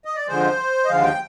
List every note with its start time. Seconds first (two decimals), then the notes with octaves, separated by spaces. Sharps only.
0.05 D#5
0.15 D5
0.27 F2 D3 F3 G#3 C5
0.85 D#5
0.88 D#2 D3 F3 G#3 F5
1.04 G5